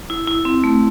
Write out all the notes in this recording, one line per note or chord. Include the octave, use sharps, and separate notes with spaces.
E4
E4
C4
A3